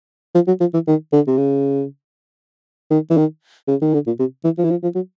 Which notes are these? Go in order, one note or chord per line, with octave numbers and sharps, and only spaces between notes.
F3
F#3
F3
E3
D#3
D3
C3
C#3
D#3
E3
D#3
C#3
D#3
D3
A#2
C3
E3
F3
E3
F3
F3
F#3